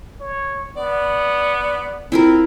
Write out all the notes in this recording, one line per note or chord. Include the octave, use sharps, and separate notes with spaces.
C#5
B3 D5
C4 E4 F4 A#4